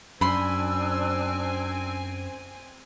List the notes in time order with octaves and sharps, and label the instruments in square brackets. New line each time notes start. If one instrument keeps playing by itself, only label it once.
[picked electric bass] F#2 [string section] C4 G#5 [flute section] D4 E6 [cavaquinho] B5 C6